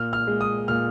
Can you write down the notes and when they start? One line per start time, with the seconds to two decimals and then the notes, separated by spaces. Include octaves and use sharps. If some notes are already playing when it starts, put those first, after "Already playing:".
Already playing: A#2 F6
0.13 F6
0.27 G#3
0.41 D#6
0.68 A#2 F6